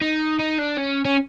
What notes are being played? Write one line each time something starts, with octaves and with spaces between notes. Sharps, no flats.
D#4
D#4
D4
C#4
C#4